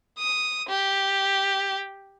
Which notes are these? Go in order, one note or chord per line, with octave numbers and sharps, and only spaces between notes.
D#6
G4